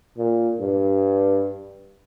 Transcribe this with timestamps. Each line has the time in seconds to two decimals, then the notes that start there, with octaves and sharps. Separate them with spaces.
0.18 A#2
0.60 G2